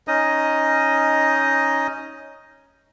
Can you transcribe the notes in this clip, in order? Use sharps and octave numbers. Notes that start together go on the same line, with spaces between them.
C#4 D#4 D#5 D#6